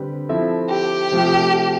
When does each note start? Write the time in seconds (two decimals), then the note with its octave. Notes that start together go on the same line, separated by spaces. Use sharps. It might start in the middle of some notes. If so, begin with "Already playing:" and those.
Already playing: D3 G3 C4 G4 B4
0.29 F3 C4 E4 A4 E5
0.70 G4
1.11 C3 F3 A3